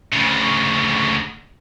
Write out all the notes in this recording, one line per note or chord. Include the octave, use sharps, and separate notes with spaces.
D2 C#3